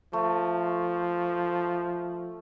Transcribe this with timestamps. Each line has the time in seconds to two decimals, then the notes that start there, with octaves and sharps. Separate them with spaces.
0.13 F3 A3